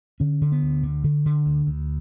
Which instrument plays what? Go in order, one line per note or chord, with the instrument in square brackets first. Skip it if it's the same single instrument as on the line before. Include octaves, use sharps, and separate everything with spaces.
[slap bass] D3 C#4
D3
B3
D2
D3
D3
D3
D2
D2